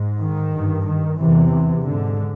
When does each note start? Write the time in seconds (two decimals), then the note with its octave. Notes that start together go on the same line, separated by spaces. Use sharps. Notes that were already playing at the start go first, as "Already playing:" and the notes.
Already playing: G#2
0.20 D#3
0.52 G2
0.86 D#3
1.19 E2 C3 E3
1.52 E3
1.84 G#2 D3